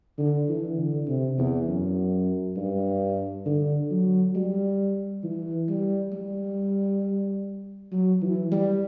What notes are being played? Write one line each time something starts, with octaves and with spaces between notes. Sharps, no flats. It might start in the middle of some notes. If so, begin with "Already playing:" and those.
D3
E3
D3
C3
E2
F#2
G2
D3
F#3
G3
E3
G3
G3
F#3
E3
G3